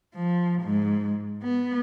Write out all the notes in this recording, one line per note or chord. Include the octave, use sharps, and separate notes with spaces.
F3
G#2
B3